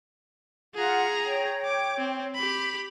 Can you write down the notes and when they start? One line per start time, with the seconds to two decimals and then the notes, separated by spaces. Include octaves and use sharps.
0.74 F4 G#4 F#5 A#5
1.25 C#5 G5
1.65 D6
1.98 C4
2.35 G4 B5